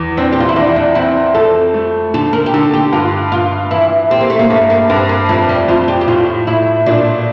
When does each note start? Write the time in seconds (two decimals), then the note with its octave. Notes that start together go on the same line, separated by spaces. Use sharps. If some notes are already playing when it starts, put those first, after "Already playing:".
Already playing: E2
0.17 C4 D4
0.32 G4
0.40 F4
0.49 E4
0.56 E2 D4
0.76 D4
0.95 C4 E4
1.34 F2 A4
1.74 A3
2.14 D3 A4
2.33 A#4
2.46 G4
2.54 D3 A4
2.74 G4
2.92 G2 F4
3.32 G2 F4
3.71 E3 E4
4.10 C4 G4
4.21 A#3
4.30 A3
4.39 A#3
4.50 G2 A3
4.70 A#3
4.90 G2 C4
5.09 A#3
5.29 F2 A3
5.49 G3
5.68 F2 F4
5.88 G4
6.01 G4
6.08 A2 F4
6.47 A2 E4
6.86 A#2 D4